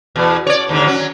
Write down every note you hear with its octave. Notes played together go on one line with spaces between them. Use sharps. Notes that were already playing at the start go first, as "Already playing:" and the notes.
E2 B2
C#5 D5
D#2 G#2 D3
F#3 C#4